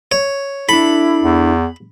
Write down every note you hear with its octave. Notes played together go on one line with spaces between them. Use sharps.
C#5
D4 E4 A4 B5
E2